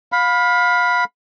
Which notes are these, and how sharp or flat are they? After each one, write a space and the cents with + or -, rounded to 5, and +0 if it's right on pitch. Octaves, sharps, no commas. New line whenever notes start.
F5 +25 B5 +0